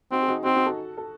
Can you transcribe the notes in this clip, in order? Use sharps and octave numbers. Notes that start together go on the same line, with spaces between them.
C4 D#4 F#4
G#4
D#4 F#4
C4 D#4 F#4
D#4 F#4
F#4 A4
A4